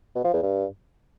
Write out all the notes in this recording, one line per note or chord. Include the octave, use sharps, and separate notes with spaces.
B2
F3
E2
G2